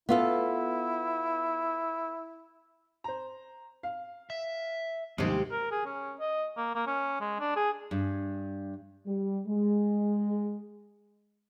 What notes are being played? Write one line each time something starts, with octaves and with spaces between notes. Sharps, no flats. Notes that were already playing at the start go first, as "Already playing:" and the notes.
B3 E4 F4 A4
C5 A#5
F5
E5
G1 D#2 C3 D#3 G#3
A#4
G#4
C#4
D#5
A#3
A#3
C#4
G#3
D4
G#4
G2
G3
G#3